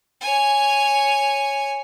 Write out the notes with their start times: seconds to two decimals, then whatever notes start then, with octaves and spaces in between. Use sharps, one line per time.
0.21 C#5 G#5